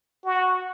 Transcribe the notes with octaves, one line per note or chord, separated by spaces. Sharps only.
F#4